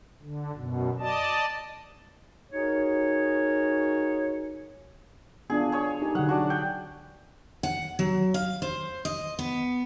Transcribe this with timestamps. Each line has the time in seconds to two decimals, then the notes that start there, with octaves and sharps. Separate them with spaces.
0.22 D3
0.54 F#2 B2
0.99 D5 D#5 A5
2.51 D#4 F#4 G#4 A#4 C#5
5.50 B3 D4 F4 G#4
5.72 G#4 C#5
6.02 D#4 G4 A4
6.15 D3 F#3 F#5
6.29 D4 F#4
6.50 G5
7.63 F#5
7.99 F#3
8.34 F5
8.62 C5
9.05 D#5
9.39 B3